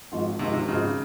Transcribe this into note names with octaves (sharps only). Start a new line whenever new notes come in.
G#1 G#2 F3
G#1 G#2 C3 F3
C3
G#1 G#2 C#3 F3